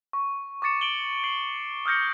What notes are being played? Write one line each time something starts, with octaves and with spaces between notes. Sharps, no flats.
C#6
C#6 D6 A6 C#7 E7
D7 F#7 G7
C7 D7 F#7
D#6 F6 G6 A#6 C#7